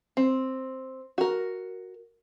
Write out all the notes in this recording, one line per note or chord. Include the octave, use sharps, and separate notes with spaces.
C4
F#4 A#4